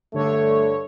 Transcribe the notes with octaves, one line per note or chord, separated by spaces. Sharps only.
G2 D3 A3 C#5